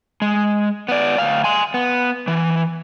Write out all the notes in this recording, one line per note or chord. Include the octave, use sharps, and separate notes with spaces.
G#3
B3 D5
D2 F5
G#5 C6
B3
E3